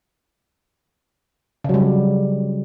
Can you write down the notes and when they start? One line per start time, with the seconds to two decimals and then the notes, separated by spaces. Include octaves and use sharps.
1.64 C#3
1.69 F#3
1.74 G3